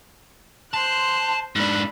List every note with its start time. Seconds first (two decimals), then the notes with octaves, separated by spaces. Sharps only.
0.74 C5 A5 C6 F#6
1.56 G#2 D4 B5 E6 F#6